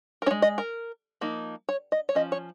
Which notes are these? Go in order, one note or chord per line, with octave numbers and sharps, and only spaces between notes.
A#4
C#4 C#5
G#3
D#5
A#4
F3 A#3 D#4
C#5
D#5
C#5
F3 C#4 D#5
C#5